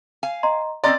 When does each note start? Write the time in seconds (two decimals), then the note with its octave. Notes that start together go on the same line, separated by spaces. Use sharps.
0.23 F5 G#5
0.43 D#5 A#5 C6
0.84 C4 C#4 D5 D#5 A#5 C6 A6